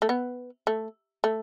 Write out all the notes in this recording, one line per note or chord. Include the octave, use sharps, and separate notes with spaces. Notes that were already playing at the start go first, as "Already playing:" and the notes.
A3
B3
A3
A3